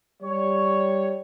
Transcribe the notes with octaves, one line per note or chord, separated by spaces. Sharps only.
G3 C#5